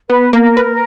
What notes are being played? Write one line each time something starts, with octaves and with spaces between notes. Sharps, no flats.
B3 B4
A#3 A#4
B4